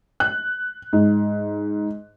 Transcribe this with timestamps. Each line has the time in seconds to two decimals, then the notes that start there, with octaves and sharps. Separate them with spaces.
0.20 F#6
0.93 G#2